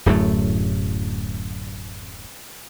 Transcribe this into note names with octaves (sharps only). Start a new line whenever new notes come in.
D1 F#2 A2 A3